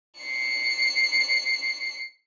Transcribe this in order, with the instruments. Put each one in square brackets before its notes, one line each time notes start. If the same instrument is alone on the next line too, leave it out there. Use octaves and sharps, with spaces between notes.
[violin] C7 C#7